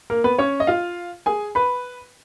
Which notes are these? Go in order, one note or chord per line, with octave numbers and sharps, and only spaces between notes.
A#3 A#4
B3 B4
C#4 C#5
D#5
F4 F5
G#4 G#5
B4 B5